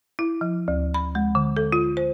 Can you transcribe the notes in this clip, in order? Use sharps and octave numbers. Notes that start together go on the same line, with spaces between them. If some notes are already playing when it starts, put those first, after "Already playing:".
E4
F3
D2
B5
G#3
D3
A4
F4
C5